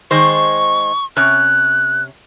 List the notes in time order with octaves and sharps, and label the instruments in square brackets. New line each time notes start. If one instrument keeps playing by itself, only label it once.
[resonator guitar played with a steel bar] D#3 G#3 C5 [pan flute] C#6
[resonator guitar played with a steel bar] C3 C#4 [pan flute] F#6